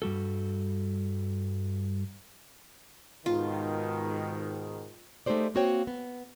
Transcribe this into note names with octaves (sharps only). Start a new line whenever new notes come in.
G2 G3 F#4 A4
G#2 B2 D#3 F4
G#3 A3 D#4 G4 C5 D5
A#3 C4 F#4 C5 C#5 G5
B3